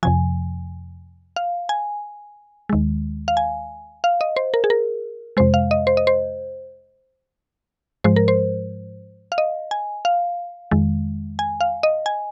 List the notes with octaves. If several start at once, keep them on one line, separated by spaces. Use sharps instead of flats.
F2 C3 F3 G#5
F5
G#5
D#2 D#3 G#3
F5
G#5
F5
D#5
C5
A#4
G#4
A#4
F2 C3 G#3 C5
F5
D#5
C5
D#5
C5
G#2 F3 G#3 C5
A#4
C5
F5
D#5
G#5
F5
F2 D#3 G#3
G#5
F5
D#5
G#5